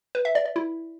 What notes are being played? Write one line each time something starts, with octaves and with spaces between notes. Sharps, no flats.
B4
E5
D5
D5
E4